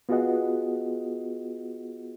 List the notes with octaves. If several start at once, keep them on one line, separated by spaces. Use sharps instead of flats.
B3 F4 F#4 G#4 D#5 F#5